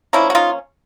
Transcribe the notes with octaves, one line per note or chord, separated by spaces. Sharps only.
F3 A#3 C#4 D4 E4
F#4
D#4 F4